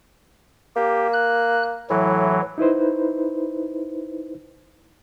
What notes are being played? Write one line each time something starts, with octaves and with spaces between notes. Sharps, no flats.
A#3 G4
F#6
A2 E3 F#3
D#4 E4 B4 C5